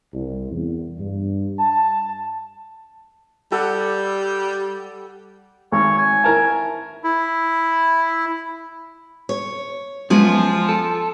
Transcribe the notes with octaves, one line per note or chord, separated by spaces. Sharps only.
C2
E2
G2
A5
G3 G4 A4 F#5
G#1 C#5
G#5
E4 A#4 A5
E4
C#5
F#2 F3 G#3 B3 F4 G#4
A4